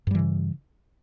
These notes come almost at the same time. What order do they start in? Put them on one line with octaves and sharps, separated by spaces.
G2 G3 E3 C#3